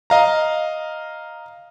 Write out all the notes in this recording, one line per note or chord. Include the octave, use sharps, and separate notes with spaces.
D#5 F5 A#5